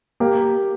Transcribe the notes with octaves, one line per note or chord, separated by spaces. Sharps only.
A#3 G4